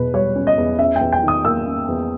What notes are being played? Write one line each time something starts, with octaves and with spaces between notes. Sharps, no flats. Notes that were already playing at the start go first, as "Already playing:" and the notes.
Already playing: E2 B2 B4
G3 C#5
C#4
D#5
E2
C#4 E5
G5
E2
G5
D#3 D#6
A#3 E6
C#4
E2